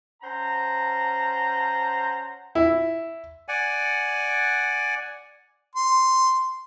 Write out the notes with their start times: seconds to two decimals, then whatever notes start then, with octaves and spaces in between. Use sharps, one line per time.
0.22 C#4 C5 F#5 A5 A#5
2.55 E4
3.48 D5 F#5 G#5
5.75 C6